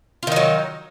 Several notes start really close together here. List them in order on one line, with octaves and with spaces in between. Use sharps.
F4 D#3 D#4 F#3